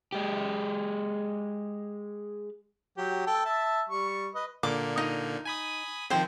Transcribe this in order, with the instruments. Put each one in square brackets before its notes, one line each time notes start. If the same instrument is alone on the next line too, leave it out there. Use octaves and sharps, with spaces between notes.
[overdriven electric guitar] G#3 G4
[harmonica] F#3 G4
A4 G5
E5 A5
G3 C#6
B4 D#5
[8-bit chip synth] A#2 D3 A#3 [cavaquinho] D6
[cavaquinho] D#4
[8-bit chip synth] G#5 B5 D#6
[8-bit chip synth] D#3 F3 C4 [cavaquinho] C5 G5